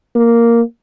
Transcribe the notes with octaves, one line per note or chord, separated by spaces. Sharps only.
A#3